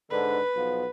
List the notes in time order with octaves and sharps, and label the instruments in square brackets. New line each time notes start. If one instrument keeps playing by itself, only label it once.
[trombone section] G#2 D3 [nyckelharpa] B4
[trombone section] B1 F3 B3